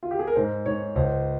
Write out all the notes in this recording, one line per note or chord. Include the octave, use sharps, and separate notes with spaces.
F4
G4
G#4
A#4
G#2 C5
G#2 C#5
C#2 C5